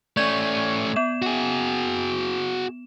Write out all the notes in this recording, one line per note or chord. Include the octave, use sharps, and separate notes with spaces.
A3 C#4 D5 C#6 G#6
B3 E7
F#4 G#4